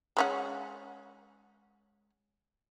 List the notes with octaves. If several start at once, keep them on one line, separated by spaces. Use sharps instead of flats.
G#3 C#4 F#5